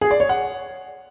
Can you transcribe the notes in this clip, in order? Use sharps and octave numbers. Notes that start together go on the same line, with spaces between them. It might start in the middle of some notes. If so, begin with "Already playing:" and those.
G#4
D5
C#5
F#5